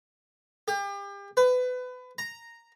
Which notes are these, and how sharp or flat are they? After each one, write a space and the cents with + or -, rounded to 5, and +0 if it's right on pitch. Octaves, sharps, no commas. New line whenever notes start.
G4 +35
B4 +25
A#5 -5